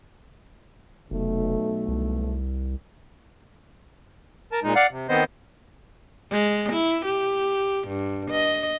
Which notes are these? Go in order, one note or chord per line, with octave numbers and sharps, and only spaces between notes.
F1 B1 A3
C2
A#4 A5
A#2 G#3 D#4
D5 F5 F#5
C3
D#3 B3 C4 C5 D#5
G#3
E4
G4
G2
D#5